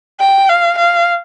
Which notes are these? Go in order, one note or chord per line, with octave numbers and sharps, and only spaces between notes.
G5
F5
F5